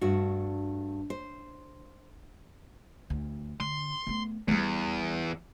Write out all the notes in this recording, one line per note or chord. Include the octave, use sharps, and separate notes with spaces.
G2 A3 D4 F#4
C5
D2
D3 C6
A3 B3
E2 E3 G3